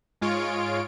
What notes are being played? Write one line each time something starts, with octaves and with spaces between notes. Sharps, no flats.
G#2 G#3 F4 C#5 D7